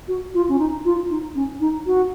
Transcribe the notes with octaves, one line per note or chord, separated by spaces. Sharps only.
F#4
F4
C#4
D#4
F4
D#4
C#4
D#4
F#4